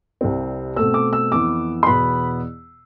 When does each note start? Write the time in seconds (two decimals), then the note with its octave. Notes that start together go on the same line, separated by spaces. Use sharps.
0.21 C2 C3 G3 C4
0.76 B2 A3 C4 E6
0.94 D6
1.13 E6
1.31 F2 E3 B3 D6
1.83 C6
1.86 E2 B2 B3 B5